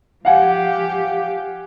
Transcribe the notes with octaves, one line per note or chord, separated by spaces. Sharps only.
F3 G4 F5 F#5 G#5